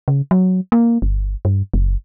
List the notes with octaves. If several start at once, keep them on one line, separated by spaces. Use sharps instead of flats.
C#3
F#3
A#3
G1
G2
F#1